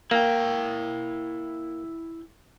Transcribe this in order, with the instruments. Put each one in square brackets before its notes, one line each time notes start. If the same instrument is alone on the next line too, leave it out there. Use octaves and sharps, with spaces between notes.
[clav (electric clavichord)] A#3 [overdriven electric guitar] E4 G5